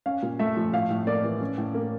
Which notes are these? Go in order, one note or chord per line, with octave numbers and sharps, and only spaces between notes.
C#4 F5
A#2
A3 E5
F3
A2 F5
A2
A#3 D5
E3
C#4
A2
A#3